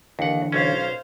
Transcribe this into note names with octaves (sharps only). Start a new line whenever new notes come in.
D#2 D3 E3 F#5
B1 C#4 C5 F5